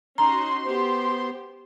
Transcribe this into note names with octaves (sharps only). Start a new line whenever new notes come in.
C#4 D#4 F#4 A#5 C6
B3 G4 C5